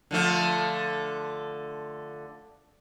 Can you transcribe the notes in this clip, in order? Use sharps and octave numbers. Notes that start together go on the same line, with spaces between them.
D3 F3 A3